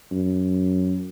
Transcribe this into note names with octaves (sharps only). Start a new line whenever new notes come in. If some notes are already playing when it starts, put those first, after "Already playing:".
F#2